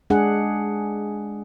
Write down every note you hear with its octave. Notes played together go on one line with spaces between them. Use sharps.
G#3 D4 G#4 F#5